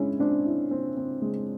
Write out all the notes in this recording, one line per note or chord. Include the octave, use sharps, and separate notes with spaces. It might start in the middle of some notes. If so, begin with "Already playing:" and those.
Already playing: G#3 C#4 D4 E4
C4 D4
E4
C4
C4
G#3